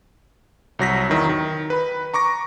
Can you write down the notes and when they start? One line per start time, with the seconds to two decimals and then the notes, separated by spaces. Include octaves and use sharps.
0.79 C2 F#3 A#6 B6
1.10 E2 D#3 F#3 E4
1.29 D#3
1.70 B4 B5
2.14 A#5 C#6 D6 A#6